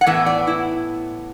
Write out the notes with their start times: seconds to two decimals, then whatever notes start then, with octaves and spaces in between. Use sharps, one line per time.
0.01 F#5
0.06 A2 E3 B3 E5
0.26 D5
0.47 E4